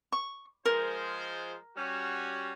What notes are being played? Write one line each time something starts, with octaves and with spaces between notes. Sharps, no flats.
C#6
F3 G#3 A#4 C5
G3 C#4 F#4